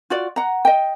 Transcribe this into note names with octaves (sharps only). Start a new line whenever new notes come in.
F4 F#4 D5
F#5 A#5
D#5 G5